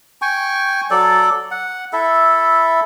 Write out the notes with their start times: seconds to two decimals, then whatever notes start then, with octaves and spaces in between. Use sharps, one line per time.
0.22 G5 G#5 C#6
0.91 F#3 A4 D5
1.51 F#5
1.93 E4 A4 E5